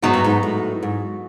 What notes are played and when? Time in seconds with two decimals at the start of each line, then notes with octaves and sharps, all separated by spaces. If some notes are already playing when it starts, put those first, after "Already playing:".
0.02 G#2 F#3 B3 D#4 F#4 B4
0.14 G2
0.24 G#2
0.43 A2
0.83 G#2